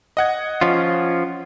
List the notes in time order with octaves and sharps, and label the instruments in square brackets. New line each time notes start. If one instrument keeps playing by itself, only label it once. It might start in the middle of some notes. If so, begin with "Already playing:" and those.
[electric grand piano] D#5 F#5 G#6
[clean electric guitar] F3 C#4 F4